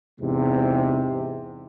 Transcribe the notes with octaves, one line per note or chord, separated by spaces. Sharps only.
E2 G#2 C3